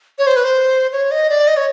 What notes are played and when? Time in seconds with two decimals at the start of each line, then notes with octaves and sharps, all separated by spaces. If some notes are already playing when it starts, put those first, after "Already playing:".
0.19 C#5
0.27 C5
0.36 B4
0.44 C5
0.92 C#5
1.11 D#5
1.30 D5
1.48 D#5
1.57 C#5